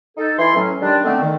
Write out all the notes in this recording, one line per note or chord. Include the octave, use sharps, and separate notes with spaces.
D#4 A4
E3 E4 C6
A2 F#3 C#4
D#3 G3 G#3 D4
D3 D#3 A3 B3 C4
D#3